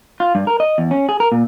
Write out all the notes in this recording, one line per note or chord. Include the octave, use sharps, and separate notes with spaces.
F4
G2
A#4
D#5
E2
C#4
G#4
A#4
A#2